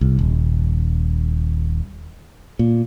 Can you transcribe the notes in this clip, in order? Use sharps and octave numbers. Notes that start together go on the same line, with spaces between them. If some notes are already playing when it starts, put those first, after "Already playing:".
C2
D#1
A#2